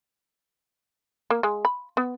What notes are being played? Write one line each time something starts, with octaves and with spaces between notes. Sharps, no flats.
A#3
G#3
B5
B3